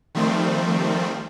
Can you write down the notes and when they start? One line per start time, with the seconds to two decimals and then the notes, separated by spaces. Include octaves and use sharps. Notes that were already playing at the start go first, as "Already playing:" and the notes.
0.15 D#3 F3 G3 A3 C4